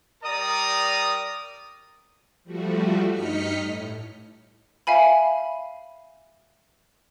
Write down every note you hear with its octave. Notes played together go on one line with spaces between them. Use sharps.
G3 A#4 D5 A#5 D#6
F3 G3 A3 F#4
G2 D#4 D#5 F6 B6 C#7
A2
E5 F5 G#5 B5